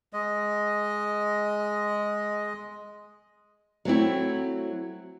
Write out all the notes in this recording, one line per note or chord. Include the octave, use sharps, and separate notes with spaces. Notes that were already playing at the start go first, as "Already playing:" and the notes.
G#3 D#5
F#3 A3 C4 E4